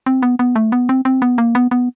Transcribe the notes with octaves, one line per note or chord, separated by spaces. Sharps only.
C4
B3
B3
A3
B3
C4
C4
B3
A#3
B3
B3